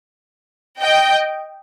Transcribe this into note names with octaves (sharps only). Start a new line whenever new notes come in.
D#5 G5